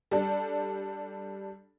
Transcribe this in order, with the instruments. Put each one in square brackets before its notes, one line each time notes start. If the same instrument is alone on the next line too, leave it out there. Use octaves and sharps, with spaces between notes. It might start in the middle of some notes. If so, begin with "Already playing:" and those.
[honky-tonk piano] G3 D4 A4